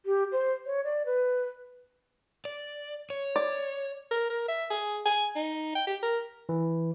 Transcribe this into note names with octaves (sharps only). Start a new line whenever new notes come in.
G4
C5
C#5
D5
B4
D5
C#5
D5
A#4
A#4
E5
G#4
G#5
D#4
G5
G4
A#4
E3